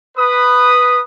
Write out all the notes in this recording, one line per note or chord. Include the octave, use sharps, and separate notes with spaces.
B4 D#6